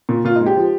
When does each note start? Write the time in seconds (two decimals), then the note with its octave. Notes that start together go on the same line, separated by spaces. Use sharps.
0.09 A#2
0.25 A#2 F4
0.36 D#4
0.41 G#3
0.46 G4
0.57 F3